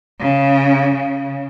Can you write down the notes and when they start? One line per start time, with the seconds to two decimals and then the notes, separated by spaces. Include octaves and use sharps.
0.20 C#3
0.95 C#3